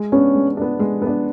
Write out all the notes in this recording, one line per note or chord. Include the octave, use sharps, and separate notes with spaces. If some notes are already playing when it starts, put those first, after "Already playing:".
Already playing: G#3
B3 C#4 D4
G#3
B3 D4
G#3
B3 D4